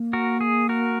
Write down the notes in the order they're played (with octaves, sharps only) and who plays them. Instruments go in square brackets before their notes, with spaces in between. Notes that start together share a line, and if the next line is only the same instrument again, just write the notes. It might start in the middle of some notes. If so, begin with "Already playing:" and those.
Already playing: [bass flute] A#3
[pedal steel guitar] F#4 A#4
G#4
F#4 A#4